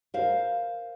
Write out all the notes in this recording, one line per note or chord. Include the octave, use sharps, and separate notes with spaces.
A#4 C5 F5